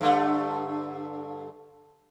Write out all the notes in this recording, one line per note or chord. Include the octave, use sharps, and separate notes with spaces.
G2 D3 A3